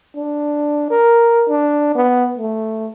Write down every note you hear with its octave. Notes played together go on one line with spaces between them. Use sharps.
D4
A#4
D4
B3
A3